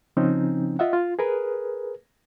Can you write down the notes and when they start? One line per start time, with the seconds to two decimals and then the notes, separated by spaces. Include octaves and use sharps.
0.17 C#3 F3 C4 C#4 D#4
0.79 F4 D#5 E5 F#5
0.93 F4
1.19 G#4 A#4 B4